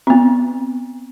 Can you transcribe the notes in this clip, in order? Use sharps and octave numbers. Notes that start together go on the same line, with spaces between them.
B3 C4